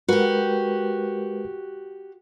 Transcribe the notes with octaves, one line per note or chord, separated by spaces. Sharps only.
G#3 F#4 G4 A#4 B4